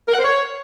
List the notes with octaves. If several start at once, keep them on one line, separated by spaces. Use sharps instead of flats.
A#4
F#5
C5
C#5